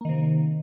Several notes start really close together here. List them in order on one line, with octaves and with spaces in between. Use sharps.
A#3 D#3 C3